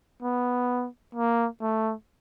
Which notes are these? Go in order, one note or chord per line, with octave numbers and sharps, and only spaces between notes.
B3
A#3
A3